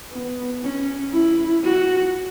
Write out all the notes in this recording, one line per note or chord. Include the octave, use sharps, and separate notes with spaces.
B3
C#4
E4
F#4